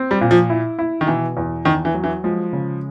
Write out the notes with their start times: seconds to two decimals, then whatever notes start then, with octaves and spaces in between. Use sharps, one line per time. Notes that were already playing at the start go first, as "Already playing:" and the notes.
Already playing: C4
0.11 G3
0.21 A#2
0.31 F3
0.50 E4
0.79 E4
1.01 D#3
1.07 B2 E3
1.37 E2
1.65 E2 D#3
1.85 E3
1.94 F#3
2.04 E3
2.24 F3 G#3
2.53 C#3